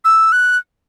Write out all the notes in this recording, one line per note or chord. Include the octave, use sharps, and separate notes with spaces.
E6
F#6